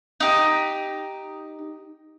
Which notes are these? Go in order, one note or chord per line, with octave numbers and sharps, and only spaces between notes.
D#4 G4